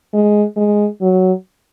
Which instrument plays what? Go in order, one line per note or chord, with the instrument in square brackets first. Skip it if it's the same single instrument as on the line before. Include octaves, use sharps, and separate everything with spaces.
[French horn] G#3
G#3
F#3